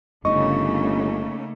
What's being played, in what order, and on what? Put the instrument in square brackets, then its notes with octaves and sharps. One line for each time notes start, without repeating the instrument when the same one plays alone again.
[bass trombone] G1 [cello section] C#3 A3 A#3 [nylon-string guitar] D#4 D#5 [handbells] C#6